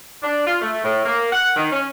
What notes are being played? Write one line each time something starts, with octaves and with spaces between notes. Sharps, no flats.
D4
F4
A3
A2
A#3
F#5
D#3
C#4